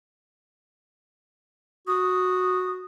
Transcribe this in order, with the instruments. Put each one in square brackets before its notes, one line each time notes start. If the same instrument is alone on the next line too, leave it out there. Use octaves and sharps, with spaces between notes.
[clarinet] F#4 [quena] D#6